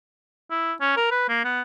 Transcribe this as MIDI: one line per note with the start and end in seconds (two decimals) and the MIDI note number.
0.51 0.73 64
0.81 0.93 61
0.97 1.06 70
1.11 1.27 71
1.29 1.40 58
1.45 1.62 59